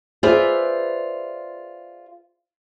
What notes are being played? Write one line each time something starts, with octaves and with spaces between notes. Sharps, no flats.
F4 G#4 B4 C5 D5 E5